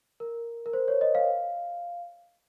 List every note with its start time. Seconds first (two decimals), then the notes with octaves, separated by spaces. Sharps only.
0.20 A#4
0.66 A#4
0.73 C5
0.88 C#5
1.01 D#5
1.15 F5